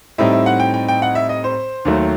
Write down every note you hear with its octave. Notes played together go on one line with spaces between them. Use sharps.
A2 G3 C4 D#4 E5
E5
F#5
G5
G5
G5
F#5
E5
D#5
C5
D#2 D#3 F#3 A3